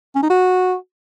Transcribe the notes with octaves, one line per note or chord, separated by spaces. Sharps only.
C#4
D#4
F#4